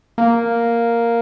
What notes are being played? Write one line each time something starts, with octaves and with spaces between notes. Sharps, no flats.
A#3